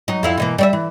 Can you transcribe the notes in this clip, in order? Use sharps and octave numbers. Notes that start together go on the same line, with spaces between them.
F#3 D#4
F2 E4 F5
B2 E3 A#3
G3 D5 E5
E3